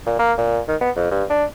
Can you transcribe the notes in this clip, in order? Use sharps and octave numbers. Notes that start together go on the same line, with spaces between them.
A#2
A#3
A#2
D#3
B3
F2
G2
D4